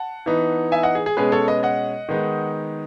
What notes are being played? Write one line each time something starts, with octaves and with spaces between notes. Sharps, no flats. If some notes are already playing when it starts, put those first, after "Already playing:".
Already playing: F#5 A5
E3 B3 D#4
E5 G#5
D#5 F#5
G#4
G#4
B2 G#3 C#4 G#4 B4
A4 C#5
B4 D#5
D#5 F#5
D#3 G#3 B3 D#4